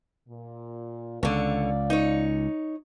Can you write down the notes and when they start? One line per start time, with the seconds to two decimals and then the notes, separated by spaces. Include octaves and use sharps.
0.29 A#2
1.23 C#2 D3 C#5 D5 F5
1.90 D#4 C#5